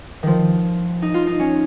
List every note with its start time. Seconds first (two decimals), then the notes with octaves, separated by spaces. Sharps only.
0.23 D#3 F3
1.02 D#4
1.14 F4
1.27 D#4
1.39 C#4